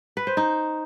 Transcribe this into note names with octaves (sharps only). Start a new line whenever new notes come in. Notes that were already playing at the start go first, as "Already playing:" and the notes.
B4
C5
D#4